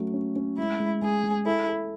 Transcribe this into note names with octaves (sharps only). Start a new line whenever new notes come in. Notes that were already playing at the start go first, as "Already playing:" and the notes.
Already playing: F#3 A3 C#4 A4
C#4
C#4
G#3 E4
G#3
G#3 G#4
G#3
E4 A4
A4